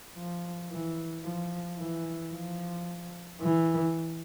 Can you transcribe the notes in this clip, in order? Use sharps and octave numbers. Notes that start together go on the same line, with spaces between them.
F3
E3
F3
E3
F3
E3